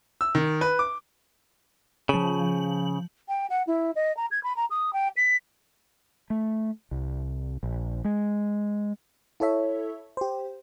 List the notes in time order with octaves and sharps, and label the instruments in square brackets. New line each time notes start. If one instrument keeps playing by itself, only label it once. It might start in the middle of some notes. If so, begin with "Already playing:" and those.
[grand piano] E6
D#3
B4
D6
[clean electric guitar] C#3 [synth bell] F3 F#7
[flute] G5
F#5
E4
D#5
A#5
G#6
B5
A#5
D#6
G5
B6
[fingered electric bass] A3
C2
A#1
G#3
[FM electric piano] E4 A4 C#5 E5
G4 C5